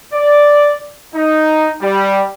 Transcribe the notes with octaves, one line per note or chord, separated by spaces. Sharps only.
D5
D#4
G3